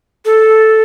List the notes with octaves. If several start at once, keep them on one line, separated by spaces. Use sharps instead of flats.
A4